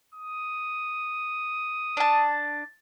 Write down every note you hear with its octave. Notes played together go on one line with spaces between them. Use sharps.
D#6
D4 A5